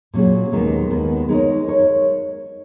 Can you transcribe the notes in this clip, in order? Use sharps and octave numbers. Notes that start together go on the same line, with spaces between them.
A#2 F#3 C#4 G#4
D#2 D#3 G#3 B3
D#2 D#3 G#3 B3
G#3 D#4 A#4 C#5
G#3 D#4 A#4 C#5